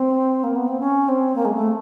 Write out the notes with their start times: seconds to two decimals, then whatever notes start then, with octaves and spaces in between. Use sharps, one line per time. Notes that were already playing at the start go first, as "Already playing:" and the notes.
Already playing: C4
0.44 A#3
0.56 B3
0.68 C4
0.80 C#4
1.08 C4
1.36 A#3
1.45 G#3
1.54 A3